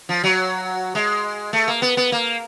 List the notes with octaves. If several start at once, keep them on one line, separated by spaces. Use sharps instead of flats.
F3
F#3
G#3
A3
A#3
B3
B3
A#3